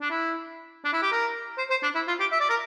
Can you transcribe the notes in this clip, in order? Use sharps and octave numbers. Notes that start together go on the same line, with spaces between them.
D4
E4
D4
E4
G4
A#4
C5
C5
D4
E4
F4
G4
E5
D5
A#4